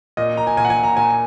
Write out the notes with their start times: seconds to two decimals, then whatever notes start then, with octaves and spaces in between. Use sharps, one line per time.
0.17 A#2 D#5
0.37 A#5
0.47 G#5
0.57 A#2 G#5
0.65 F#5
0.70 G#5
0.83 A#5
0.97 A#2 G#5